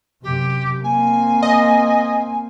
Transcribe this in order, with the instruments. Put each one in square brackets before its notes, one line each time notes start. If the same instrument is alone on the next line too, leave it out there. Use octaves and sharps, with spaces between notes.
[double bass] F#2 C3 [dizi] G4
[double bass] A#3 C4 [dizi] G#5
[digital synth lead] D#5